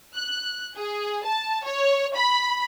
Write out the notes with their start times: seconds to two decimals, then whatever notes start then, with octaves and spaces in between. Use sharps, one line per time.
0.14 F#6
0.76 G#4
1.24 A5
1.64 C#5
2.16 B5